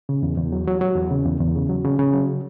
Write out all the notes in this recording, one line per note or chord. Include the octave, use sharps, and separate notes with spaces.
C#3
E2
E2
F#3
F#3
F#3
E2
C#3
E2
E2
C#3
F#3
C#3
C#3
F#3